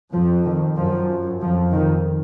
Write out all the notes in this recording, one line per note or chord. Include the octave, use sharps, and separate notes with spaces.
F2 F3
D#3
F#2 F3
F2 F3
D#3